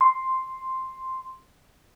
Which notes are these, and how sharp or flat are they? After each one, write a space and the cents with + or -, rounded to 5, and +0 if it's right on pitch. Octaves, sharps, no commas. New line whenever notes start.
C6 +0